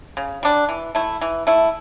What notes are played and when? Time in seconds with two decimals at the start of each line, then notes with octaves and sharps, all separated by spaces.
0.17 C#3
0.43 G3 D4
0.69 E3
0.95 A3 E4
1.22 E3
1.47 A3 E4